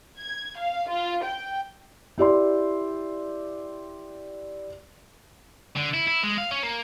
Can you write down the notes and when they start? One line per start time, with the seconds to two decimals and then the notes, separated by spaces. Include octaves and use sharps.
0.18 G#6
0.59 F5
0.89 F4
1.24 G5
2.18 E4 G4 D5 C6
5.76 D3
5.94 E4
6.07 E4
6.23 G#3
6.38 F5
6.51 C#4
6.63 A#3